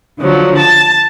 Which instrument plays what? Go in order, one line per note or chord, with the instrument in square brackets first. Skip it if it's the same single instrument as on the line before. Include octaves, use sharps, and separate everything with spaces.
[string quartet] D3 F3 F#3
A5